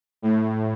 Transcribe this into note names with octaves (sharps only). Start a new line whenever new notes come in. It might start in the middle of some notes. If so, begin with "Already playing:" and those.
A2